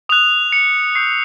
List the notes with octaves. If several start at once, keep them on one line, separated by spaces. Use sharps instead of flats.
D#6 F#6 F7
C#7
C#6 E6 G6 C7